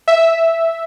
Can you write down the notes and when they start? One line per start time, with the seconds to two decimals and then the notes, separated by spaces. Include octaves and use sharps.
0.08 E5